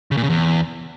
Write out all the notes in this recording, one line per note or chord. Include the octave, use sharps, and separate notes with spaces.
C#3
A#2
C#3
E2